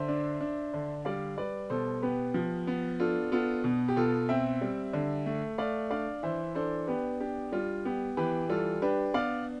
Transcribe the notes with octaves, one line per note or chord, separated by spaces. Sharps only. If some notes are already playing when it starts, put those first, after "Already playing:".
Already playing: D3 C5 E5
D4
D4
D3
G3 D5 F5
G3 B4 D5
B2 A4 C5
B3 G4 B4
F3
B3
D4 F4 A4
B3 F4 A4
B2
G4
B2 F4 A4
C4 E5 G5
G3
D3
A3
A3 D5 F5
D4 D5 F5
E3 C5 E5
D4 A4 C5
B3 G4 B4
D4 G4
G3 F4
B3 G4
E3 G4 B4
G3 F4 A4
D4 G4 B4
B3 D5 F5